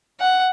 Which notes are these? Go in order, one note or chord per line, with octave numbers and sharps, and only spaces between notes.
F#5